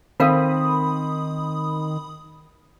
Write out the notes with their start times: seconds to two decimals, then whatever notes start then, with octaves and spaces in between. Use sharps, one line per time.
0.20 D#3 C4 A4 A#4 F5 B5 D#6